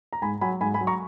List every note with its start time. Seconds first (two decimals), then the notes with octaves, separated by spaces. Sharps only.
0.13 A#5
0.22 G#2 G#5 B5
0.41 F#3 G#5 B5
0.61 G#2 G#5 B5
0.74 G#5 B5
0.81 F#3
0.87 A#5 C#6